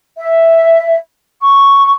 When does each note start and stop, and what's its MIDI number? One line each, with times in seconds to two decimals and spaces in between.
0.17 0.96 76
1.41 1.93 85